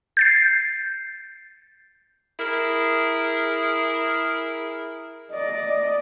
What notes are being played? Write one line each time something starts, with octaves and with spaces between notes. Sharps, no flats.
G6 A6 C7
E4 G#4 A#4
D5 D#5